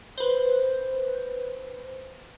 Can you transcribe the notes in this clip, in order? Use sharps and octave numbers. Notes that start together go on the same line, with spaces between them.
B4 C5